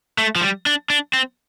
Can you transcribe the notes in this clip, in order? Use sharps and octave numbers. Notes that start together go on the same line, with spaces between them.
A3
F3
G3
D4
D4
C4